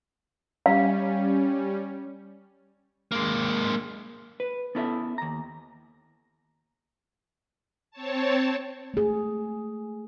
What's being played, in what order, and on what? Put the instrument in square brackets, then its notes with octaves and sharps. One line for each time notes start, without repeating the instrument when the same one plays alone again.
[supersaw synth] G3 C#4 [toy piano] F5
[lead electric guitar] G#3 A#3
[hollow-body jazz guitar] B4
B3 C#4 E4 A4 C#5 E5
D#2 A#5
[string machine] C4 C#5 A5
[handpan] A3 G#4